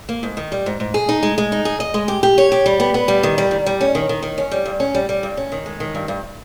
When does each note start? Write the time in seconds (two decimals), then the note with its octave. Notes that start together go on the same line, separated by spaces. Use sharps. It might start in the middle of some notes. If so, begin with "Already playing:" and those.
0.09 A#3
0.23 G#2
0.37 D#3
0.52 G3
0.66 G#2
0.80 G#2
0.94 G#4
1.09 D#4
1.23 G#3
1.38 G#3
1.52 D#4
1.65 G#4
1.80 D#5
1.94 G#3
2.08 G4
2.23 G4
2.38 C#5
2.52 G4
2.66 G3
2.80 B3
2.94 B3
3.08 G3
3.23 D#3
3.38 G3
3.51 D#3
3.66 G3
3.81 C#4
3.95 D#3
4.09 D#3
4.22 D#3
4.38 C#4
4.52 G3
4.66 G2
4.80 C#4
4.95 G3
5.09 G3
5.23 G2
5.37 C#4
5.52 D#3
5.66 G#3
5.80 D#3
5.95 G2
6.08 G2